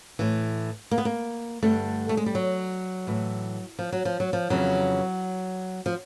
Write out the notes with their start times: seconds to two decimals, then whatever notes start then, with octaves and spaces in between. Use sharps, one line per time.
0.19 A2 E3
0.91 A#3
0.98 B3
1.05 A#3
1.63 G2 D3 A3
2.09 A3
2.17 G#3
2.26 G3
2.35 F#3
3.07 A2 E3
3.79 F3
3.92 F#3
4.05 F3
4.20 F#3
4.33 F3
4.50 F2 C#3 E3 F#3
5.86 F3